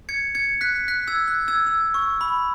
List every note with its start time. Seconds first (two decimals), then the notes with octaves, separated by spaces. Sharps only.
0.09 G#6 C#7
0.35 G#6 C#7
0.61 F#6 B6
0.88 F#6 B6
1.07 E6 G#6
1.28 F#6
1.48 E6 G#6
1.67 E6
1.94 C#6
2.21 B5